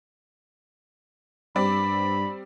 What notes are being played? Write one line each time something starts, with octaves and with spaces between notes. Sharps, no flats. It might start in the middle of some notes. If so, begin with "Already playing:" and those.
G2 G3 C4 D5 B5